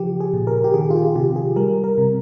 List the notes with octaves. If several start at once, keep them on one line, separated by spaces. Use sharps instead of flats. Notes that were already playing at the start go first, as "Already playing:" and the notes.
Already playing: C#3 F3 G4
G#4
A#2
A#4
G4
D#3 G#4
F4
G4
C3 G4
G#4
G3 A#4
A#4
C3